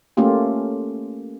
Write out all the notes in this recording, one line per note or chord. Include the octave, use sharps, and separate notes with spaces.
A3 A#3 C#4 F4 G4